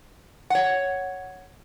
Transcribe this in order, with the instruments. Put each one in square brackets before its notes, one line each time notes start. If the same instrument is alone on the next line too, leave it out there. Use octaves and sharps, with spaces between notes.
[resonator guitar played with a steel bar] C#5 F#5